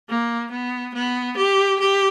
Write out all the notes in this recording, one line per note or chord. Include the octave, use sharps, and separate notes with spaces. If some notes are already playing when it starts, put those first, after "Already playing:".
A#3
B3
B3
G4
G4